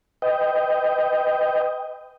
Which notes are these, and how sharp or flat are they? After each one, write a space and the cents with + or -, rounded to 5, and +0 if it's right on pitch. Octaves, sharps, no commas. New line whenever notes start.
B4 +35 D#5 +5 G5 +0